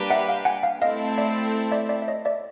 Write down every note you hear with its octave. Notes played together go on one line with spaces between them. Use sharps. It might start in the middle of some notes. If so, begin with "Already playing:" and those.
Already playing: G3 A#3 D4 G4 B4
E5 F#5
F5 G5
F#5 G#5
F5 G5
A3 C4 E4 A4 D#5 F5
D5 E5
D5 E5
D5 E5
E5
C#5 D#5
D5 E5